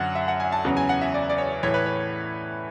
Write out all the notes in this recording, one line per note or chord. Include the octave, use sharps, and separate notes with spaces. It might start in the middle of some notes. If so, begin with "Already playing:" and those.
Already playing: F#2 D3 F#3 F#5
E5
F#5
G#5
A5
E2 C#3 F#3
G#5
F#5
E5
D5
D5
C#5
A2 E3 C#5
B4
C#5